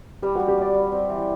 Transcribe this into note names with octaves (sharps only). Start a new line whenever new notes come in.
G3 G4
F#4
G3
G4
G3 D5
G3
C4
E3